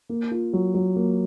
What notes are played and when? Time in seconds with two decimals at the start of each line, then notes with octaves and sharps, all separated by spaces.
0.09 A#3
0.31 F4
0.53 F#3
0.74 F#3
0.96 A#3